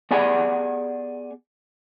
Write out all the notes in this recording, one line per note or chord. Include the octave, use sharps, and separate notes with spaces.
B3 G4 G#4 D5 F#5 G#5